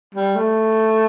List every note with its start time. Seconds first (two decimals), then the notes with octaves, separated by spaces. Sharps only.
0.15 G3
0.36 A3